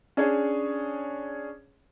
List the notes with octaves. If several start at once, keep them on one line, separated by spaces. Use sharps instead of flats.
C#4 D4 G#4 C#5